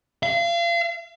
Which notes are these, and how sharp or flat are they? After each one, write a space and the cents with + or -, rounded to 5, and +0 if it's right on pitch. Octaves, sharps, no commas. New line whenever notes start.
F5 -35